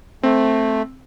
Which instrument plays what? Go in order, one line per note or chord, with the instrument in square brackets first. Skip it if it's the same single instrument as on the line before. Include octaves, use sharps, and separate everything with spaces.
[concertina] A3 [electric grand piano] C4